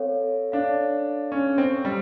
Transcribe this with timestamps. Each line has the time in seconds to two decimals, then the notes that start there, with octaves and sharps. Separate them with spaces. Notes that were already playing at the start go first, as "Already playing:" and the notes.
Already playing: C4 A4 C#5 F5
0.52 D4 A4 C#5 F5
1.32 C#4 A4 C#5 F5
1.58 C4
1.85 G3